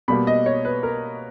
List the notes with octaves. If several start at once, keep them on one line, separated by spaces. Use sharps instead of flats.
B2 G3 A#3 B5
D#5
C#5
B4
A#4